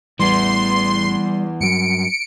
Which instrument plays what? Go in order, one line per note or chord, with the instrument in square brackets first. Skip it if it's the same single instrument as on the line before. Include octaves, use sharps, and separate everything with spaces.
[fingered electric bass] A1 [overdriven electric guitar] E3 B3 [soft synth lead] G3 [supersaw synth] C6
[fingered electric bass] G2 F#3 [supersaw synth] C#7 D7